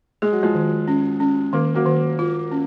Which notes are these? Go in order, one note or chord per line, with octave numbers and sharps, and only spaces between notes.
G#3 G#4
F#3
F3 G#3
D#3
C#4
C#4
D#3 A#3
F#3 A#3
D#3
F4
C#4